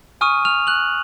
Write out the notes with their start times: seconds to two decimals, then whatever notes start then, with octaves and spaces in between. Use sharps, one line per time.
0.21 G#5 C#6 D#6 F6 D#7
0.45 F6 F7
0.67 F#6 F#7